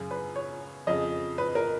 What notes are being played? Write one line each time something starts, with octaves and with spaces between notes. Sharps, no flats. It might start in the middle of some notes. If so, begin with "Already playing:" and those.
Already playing: F#2 C#3
B4
C#5
F2 C#3 D#5
B4
A#4